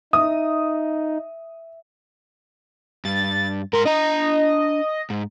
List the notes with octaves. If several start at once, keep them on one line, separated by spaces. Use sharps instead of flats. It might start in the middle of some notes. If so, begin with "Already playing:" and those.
D#4 E5 D#6
G2 A6
G#2 A#4 C6
D4 D#5 A#5
G#2